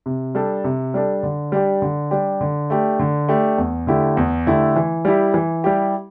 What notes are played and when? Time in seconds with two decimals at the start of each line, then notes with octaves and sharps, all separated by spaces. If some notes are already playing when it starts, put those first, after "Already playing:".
0.06 C3
0.35 G3 D4 A4
0.64 C3
0.94 G3 D4 A4
1.23 D3
1.52 G3 D4 G4
1.82 D3
2.11 G3 D4 G4
2.41 D3
2.70 A3 D4 G4
2.99 D3
3.28 A3 D4 G4
3.58 E2
3.87 D3 A3 E4 G4
4.17 E2
4.47 D3 A3 E4 G4
4.76 E3
5.05 G3 E4 G4
5.34 E3
5.64 G3 E4 G4